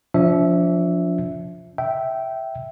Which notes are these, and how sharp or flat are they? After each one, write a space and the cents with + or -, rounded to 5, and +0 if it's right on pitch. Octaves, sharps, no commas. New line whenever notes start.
F3 +5 D4 -35 E5 +0
E5 +0 G5 -15